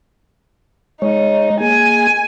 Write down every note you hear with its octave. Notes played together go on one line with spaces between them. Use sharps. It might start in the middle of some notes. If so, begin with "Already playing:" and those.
G#3 D#4 C#5
A#3 G#4 G#5